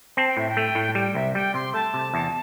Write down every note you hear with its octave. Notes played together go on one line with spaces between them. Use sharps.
C4 A5
G5
A2 E5
G5
A3
A2
G3 G5
C2 E5
G3 G5
C3 C6
A3 A5
C3
E2